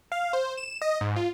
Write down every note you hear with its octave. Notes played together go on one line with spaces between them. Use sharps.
F5
C5
E7
D#5
G#2
F4